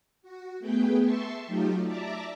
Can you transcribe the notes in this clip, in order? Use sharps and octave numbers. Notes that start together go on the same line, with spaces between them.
F#4
A3 B3 G#4 B4 G5
E5 A5 C6 C#6
F#3 A3 D#4 F4 G4
D5 E5 A5 A#5 D6